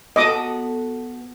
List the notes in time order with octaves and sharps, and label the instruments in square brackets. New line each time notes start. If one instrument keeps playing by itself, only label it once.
[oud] B3 F#4 A4 [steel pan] D#5 D6 D#6